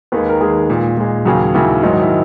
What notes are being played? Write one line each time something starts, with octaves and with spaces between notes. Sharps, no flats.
D#2 D#3 G#3 B4
A#4
D#2 D#3 G#3 G#4
A#2 G#3
A#2 G#3
D#2 C#3 F#3 G#4
D#2 C#3 F#3 E4
G#2 D#3 F#3 D#4
D#4
E4